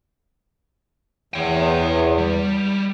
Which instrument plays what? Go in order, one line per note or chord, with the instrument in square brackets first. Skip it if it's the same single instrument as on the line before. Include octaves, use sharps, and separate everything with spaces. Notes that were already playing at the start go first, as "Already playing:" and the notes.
[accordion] E2 [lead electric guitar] C#5 G5
[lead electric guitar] G3